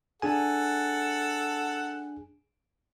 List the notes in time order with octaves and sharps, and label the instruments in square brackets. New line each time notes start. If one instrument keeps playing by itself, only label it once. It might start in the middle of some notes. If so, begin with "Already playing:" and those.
[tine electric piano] D4 G#4 G#5 [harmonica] A4 F#5